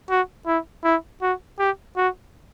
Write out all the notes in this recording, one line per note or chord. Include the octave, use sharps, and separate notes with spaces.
F#4
E4
E4
F#4
G4
F#4